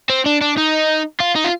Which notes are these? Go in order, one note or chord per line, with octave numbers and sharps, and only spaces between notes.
C4
D4
D4
D#4
F4
D#4
F4